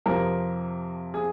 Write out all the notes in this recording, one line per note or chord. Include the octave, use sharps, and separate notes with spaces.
F2 C3 F3 A#4
G#4